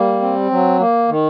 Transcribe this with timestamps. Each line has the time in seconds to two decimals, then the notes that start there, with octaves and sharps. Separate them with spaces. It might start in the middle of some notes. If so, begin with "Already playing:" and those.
Already playing: G3 A#3
0.21 C4
0.51 F#3
0.79 A#3
1.08 D#3